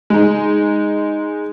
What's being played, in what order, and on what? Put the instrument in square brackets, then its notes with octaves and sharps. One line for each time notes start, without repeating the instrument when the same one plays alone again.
[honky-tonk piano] G#3 D#4